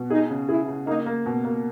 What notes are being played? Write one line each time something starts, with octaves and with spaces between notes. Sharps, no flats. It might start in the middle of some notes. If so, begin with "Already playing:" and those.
Already playing: B2
D#4 G#4
C#3
E4 G#4
C#3
A#3 D#4
A#3
B2
A#3